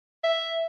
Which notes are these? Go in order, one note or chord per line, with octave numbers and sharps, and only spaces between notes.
E5